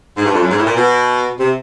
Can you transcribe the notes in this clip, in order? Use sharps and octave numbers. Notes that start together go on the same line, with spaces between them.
G#2
G2
F2
F#2
G#2
A2
A#2
B2
C3